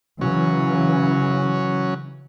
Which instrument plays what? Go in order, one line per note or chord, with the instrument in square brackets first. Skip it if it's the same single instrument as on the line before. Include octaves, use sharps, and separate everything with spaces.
[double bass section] C#3 E3 [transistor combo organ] F#3 C#4